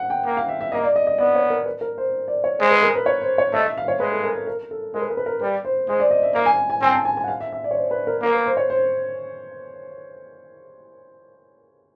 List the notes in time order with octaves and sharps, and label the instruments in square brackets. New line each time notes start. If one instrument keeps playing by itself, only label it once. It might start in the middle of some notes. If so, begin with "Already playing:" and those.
Already playing: [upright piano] F#5
G5
[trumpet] A#3
[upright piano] F5
E5
E5
[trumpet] A#3 [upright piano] D#5
[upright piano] D5
D#5
D#5
[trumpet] B3 [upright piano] D5
[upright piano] C#5
A#4
B4
A#4
C5
D5
C#5
[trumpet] G#3 [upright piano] C5
[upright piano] B4
A#4
B4
C#5
C5
C#5
[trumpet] A3 [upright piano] D#5
[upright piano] E5
F5
C#5
[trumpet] G#3 [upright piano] B4
[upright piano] A4
A#4
B4
A#4
A4
[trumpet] G#3 [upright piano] A#4
[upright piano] B4
A#4
B4
A#4
[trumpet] G3 [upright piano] B4
[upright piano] C5
[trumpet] G#3 [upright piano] C5
[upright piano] D5
D#5
E5
[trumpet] A#3 [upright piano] F5
[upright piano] G#5
G#5
[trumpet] C4 [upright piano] G#5
[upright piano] A5
G#5
G#5
F#5
F5
E5
E5
D5
C#5
C5
B4
A#4
[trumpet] A#3 [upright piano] A#4
[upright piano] B4
C5
C#5
C5